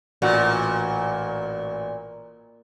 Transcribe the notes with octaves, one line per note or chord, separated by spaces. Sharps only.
A1 A#2 F#4 F#5